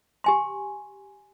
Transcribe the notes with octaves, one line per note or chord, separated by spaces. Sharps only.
G4 G#5 C6